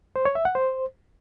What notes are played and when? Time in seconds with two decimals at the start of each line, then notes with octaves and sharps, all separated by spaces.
0.16 C5
0.25 C#5
0.35 E5
0.45 F#5
0.55 C5